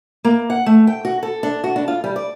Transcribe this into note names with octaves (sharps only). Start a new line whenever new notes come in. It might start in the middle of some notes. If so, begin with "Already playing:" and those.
A#3
F#5
A3
G5
F#4
A4
D4
F#4
D4
F4
G3
D5